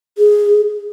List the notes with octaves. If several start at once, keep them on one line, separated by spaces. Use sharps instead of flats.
G#4